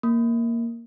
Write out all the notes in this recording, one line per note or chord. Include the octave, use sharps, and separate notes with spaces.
A#3